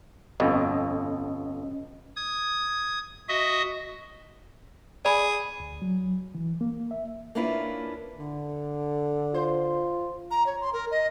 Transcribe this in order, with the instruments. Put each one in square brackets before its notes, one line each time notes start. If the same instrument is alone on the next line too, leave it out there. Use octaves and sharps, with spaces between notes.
[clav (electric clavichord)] G1 F2 B2 [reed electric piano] C#4 D#5
[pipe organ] D#6 G#6
F#4 D#5 E5 D#6
[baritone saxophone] G#4 [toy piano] D5 G#5 B5
[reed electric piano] D2
F#3
E3
A#3
E5
[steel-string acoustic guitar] A#3 C#4 D4 E4 F4 B4
[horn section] D3
[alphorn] F4 [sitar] C5
[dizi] A#5
C#5
C6
A#4
D#5